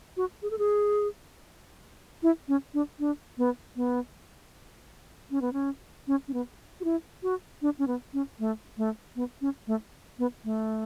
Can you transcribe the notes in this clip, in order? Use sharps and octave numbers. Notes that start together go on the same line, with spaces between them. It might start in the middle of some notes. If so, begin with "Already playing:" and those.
F#4
G#4
A4
G#4
E4
C#4
D4
D4
B3
B3
C#4
B3
C#4
C#4
C#4
B3
F#4
E4
F#4
D4
C#4
B3
C#4
A3
A3
B3
C#4
A3
B3
A3